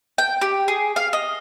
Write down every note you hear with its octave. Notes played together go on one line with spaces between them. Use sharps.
G5
G4
G#4
F5
D#5